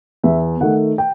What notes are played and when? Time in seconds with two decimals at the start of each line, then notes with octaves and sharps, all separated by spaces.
0.24 E2 E5
0.61 D#3 A3 F#5
0.98 G5